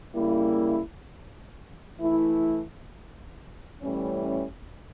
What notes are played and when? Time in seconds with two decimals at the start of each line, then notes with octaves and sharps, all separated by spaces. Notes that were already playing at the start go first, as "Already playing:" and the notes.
0.15 C#3 G3 A#3 E4
1.98 E3 A3 E4
3.81 A2 E3 G3 C#4